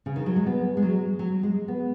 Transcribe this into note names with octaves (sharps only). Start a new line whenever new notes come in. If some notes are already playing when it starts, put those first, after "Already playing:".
C#3
D#3
F#3
G#3
B3
G#3
F#3
F#3
G#3
B3